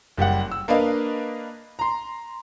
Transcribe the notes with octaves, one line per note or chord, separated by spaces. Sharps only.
F#1 G3 G4 F#5
E6
A#3 D4 B4 D#5 F5
A#5 C6